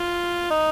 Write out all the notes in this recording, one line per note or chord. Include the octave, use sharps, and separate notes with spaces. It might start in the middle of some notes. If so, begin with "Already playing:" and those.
Already playing: F4
D#4